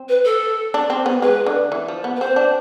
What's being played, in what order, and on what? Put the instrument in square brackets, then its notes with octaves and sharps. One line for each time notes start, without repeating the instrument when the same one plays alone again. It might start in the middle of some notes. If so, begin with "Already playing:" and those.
Already playing: [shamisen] C4
[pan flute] B4
A4
[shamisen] D4
C4
B3
[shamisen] G#3 [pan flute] B4
[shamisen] D3
E3
F3
B3
[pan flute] B4
[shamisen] C4 [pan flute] C5
[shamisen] D4